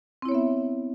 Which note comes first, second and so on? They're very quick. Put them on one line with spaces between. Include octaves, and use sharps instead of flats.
C4 E4 C#5 B3 E5